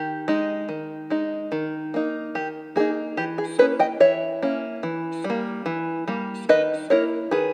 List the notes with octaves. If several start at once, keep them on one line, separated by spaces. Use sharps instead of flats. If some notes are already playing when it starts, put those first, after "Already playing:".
Already playing: D#3 G4
G#3 D#4
D#3
G#3 D#4
D#3
A#3 D#4
D#3 G4
A#3 D#4 G#4
E3 G4
G#4
A#3 C#4 E4 G#4 B4
D#5 G5
E3 C#5 E5
A#3 C#4 E4
E3
G3
A#3
E3
G3 A#3
D#3 B4 D#5
A#3 E4 A#4 C#5
D#3 G#4 B4